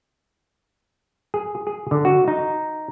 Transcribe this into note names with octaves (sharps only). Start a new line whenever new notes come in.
G#4
G#4
D3
F#4
D#4